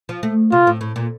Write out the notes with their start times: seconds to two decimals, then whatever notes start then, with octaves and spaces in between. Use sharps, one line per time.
0.09 F3
0.23 A3
0.52 C3 F4
0.67 A2
0.81 A2
0.96 A#2